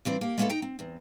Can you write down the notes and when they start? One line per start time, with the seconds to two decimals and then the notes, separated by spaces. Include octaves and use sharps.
0.05 G2 E3 C4 D4
0.21 A#3 G4
0.38 G#3 A#3 B3 C#4 E4 A4
0.49 D#4 G5 A#5
0.62 C4
0.79 E2 C4